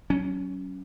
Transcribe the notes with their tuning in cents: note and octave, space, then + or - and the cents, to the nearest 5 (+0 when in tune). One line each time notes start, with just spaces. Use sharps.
F#3 +25 C#4 +0